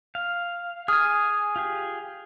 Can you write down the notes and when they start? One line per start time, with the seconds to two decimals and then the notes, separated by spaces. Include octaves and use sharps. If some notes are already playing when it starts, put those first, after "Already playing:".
0.15 F5
0.88 G#4 G#5 D#6 F6
1.56 F4 G4 G#4